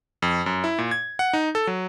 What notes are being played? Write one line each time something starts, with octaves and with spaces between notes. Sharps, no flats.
F2
F#2
E4
A#2
G#6
F#5
D#4
A4
F#3